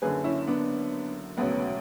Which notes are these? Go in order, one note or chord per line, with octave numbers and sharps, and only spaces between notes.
F#1 F#2 D3 G#4 B4
C#4 E4
B3 D4
E1 D2 C#3 F#3 B3